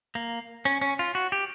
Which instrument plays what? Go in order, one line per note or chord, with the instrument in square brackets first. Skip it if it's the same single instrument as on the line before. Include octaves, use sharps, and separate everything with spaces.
[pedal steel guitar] A#3
C#4
C#4
F4
F#4
G4